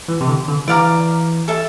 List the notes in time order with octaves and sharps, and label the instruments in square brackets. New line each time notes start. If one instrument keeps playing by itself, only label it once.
[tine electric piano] E3
C3
D3
D3
[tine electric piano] E3 [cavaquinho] D5 F5 A#5 D6
[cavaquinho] A4 E5 A5